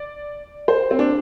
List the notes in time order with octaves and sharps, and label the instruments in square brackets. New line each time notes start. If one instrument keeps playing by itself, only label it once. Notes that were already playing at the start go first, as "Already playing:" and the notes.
Already playing: [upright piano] D5
C5
C4
D4